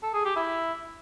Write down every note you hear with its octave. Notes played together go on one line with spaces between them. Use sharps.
A4
G#4
G4
E4